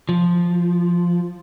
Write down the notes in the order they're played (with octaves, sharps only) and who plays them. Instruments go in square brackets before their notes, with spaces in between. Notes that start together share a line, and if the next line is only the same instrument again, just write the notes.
[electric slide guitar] F3